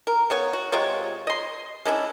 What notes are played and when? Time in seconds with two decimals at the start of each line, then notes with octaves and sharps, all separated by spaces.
0.07 A#4
0.30 C#3 B3 C#5
0.53 F#4
0.72 C3 G#3 F4 C#5
1.27 D#5 C6
1.85 G#3 C#4 D4 E4